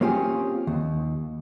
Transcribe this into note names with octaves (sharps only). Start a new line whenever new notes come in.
A#3 C4 C#4 F4 G4 G#4
D#2